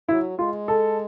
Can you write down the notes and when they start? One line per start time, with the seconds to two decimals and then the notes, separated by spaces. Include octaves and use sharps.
0.09 F#3 E4
0.38 G#3 F4
0.68 A4